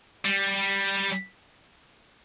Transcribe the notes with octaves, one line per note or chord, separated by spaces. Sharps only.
G3